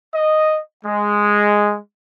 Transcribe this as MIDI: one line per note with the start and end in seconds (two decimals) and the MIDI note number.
0.13 0.58 75
0.85 1.76 56